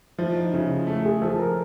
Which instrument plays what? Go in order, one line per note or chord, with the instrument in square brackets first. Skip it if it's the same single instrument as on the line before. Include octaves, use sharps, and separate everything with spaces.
[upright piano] F3 [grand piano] E4
[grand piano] D#4
[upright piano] C#3 [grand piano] E4
[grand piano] F4
[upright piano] A3
[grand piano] G#4
[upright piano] F3 [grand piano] A4
[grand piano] A#4